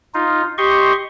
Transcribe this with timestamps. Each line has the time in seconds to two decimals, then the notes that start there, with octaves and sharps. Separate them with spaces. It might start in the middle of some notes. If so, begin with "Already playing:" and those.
0.14 D#4 F4
0.58 G4 D#5 C6 C#6